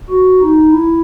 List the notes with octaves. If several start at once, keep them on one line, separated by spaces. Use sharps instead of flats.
F#4
D#4
E4